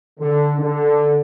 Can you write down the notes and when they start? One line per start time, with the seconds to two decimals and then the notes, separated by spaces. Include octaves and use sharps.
0.20 D3
0.59 D3